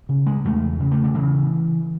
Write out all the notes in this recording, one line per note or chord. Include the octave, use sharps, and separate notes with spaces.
C#3
G#3
E2 A3
C#3
A3
D3
C#3 E3